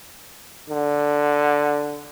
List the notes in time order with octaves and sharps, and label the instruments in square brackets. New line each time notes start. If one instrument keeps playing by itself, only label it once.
[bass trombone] D3